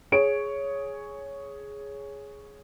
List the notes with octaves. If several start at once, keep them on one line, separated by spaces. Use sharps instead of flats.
G#4 C#5 D7